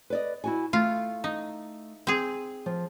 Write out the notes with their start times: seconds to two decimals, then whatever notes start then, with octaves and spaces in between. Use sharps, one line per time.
0.10 B4 D5 D#5
0.44 E4 F#4 G#5
0.73 A3 F4
1.24 D#4
2.07 C4 G#4
2.66 F3